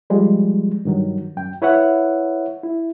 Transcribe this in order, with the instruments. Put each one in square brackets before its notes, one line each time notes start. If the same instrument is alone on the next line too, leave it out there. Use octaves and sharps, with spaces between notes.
[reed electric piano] F3 G3 G#3
G2 D#3 F#3
F#2 G5
E4 B4 C#5 E5 F#5
E4